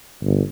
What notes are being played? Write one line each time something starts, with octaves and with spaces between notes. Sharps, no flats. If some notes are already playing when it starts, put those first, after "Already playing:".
G1